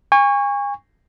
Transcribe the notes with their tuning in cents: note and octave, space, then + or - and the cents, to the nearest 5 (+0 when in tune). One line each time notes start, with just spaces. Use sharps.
G#5 -35 C#6 +0